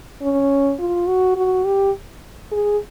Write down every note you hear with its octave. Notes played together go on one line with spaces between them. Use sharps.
C#4
F4
F#4
F#4
G4
G#4